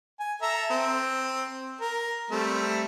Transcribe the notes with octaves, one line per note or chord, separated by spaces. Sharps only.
G#5
A4 E5 A#5
C4
A#4
G3 A3 C4